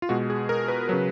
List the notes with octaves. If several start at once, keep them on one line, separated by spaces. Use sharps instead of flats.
F4
B2 G#3 F#4
G#4
A#4
B4
C#3 F#3